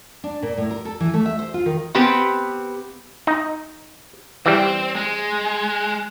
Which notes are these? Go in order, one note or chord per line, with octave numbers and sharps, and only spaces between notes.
D4
A#2
A2
A#4
A4
E3
A3
E5
C5
F4
D#3
B3 C4 G4 B4
D#4
E3 G3 C4
G#3